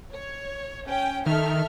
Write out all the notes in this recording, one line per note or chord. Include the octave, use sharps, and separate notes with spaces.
C#5
C#4 G5
D#3 A4 E5 F6